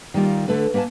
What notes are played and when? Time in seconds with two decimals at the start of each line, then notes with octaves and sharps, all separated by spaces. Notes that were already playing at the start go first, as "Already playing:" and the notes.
0.14 D#3 G3 A#3 F4
0.48 D3 A3 A4 B4
0.74 A#3 B4 F5 G#5 A5